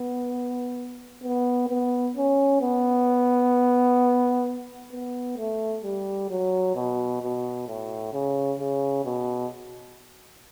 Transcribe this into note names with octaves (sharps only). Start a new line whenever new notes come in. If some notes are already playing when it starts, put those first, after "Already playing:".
Already playing: B3
B3
B3
C#4
B3
B3
A3
G3
F#3
B2
B2
A2
C#3
C#3
B2